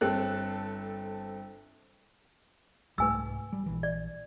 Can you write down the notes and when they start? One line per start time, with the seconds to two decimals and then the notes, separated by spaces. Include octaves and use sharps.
0.01 G1 C4 A4 F#6
2.98 C2 G#2 A3 B4 G#5 E6
3.53 G3
3.66 A#1 E3
3.83 D5